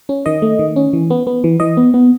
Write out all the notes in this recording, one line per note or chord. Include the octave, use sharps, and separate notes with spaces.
C#4
D#3 D#5
A3
D#3
C#4
E3
B3
B3
E3
E3 D#5
B3
B3